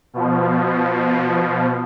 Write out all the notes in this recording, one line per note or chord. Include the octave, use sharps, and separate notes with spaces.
B2 F3